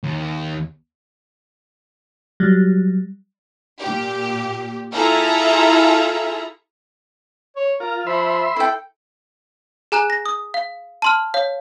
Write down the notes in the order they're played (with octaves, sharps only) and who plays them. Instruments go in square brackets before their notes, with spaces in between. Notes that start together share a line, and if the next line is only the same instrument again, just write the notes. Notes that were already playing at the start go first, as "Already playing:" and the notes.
[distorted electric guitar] D#2
[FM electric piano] F#3 G3
[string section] A#2 G4
E4 F4 G#4 A4 E5 A#5
[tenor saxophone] C#5
[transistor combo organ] F4 [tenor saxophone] A#4
[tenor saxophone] F3 [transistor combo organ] E5 B5 C6
[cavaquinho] E4 G5 [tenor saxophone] A4
[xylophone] G#4 G#5 A#5 F#6 E7
A#6
D#6
F5
A5 C6 F6
C#5 F5